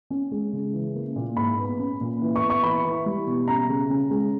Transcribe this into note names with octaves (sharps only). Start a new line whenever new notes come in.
C#4
G#3
C#3
E3
A#3
A#2
G#2 B5
B3
C#4
A#2
E3
C#6
B3
C#6
E3 B5
E3
G3
B2
C#4 A#5
C#3
C#4
G#3